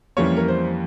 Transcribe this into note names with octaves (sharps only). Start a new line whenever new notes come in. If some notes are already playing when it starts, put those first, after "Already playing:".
F2 E3 G3 A#3 C#4 C#5
A#4
C5